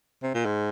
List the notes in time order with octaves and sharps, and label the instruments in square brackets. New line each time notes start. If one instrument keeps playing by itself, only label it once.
[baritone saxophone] C3
A#2
G#2